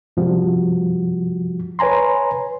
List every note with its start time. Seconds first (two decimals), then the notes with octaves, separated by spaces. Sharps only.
0.17 F#2 C3 F3 G3 F#4
1.79 B4 C#5 G#5 A#5 C6